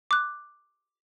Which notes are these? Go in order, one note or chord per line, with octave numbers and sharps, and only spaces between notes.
D6 F#6